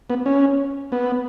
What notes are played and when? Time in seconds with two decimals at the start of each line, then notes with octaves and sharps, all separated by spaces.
0.10 B3
0.26 C#4
0.92 B3